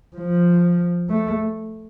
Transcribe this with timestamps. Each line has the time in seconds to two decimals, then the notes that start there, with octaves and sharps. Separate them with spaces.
0.16 F3
1.10 A3